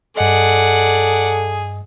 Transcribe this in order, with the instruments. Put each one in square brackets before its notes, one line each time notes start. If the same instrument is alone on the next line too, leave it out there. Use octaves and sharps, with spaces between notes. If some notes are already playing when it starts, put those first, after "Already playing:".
[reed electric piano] G2 D#5 [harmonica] G#4 [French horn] A4 [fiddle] D5 F#5